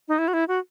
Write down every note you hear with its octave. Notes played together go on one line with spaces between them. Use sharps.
D#4
E4
F#4
E4
F#4